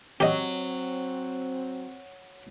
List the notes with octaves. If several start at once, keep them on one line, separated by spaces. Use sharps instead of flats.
F#3 C4 G4 D#5